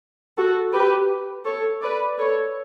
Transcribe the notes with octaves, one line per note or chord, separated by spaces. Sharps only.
F#4 A4
G4 B4
A4 C#5
B4 D5
A4 C#5